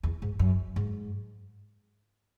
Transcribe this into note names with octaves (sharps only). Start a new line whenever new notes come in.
E2
G#2
F#2
G#2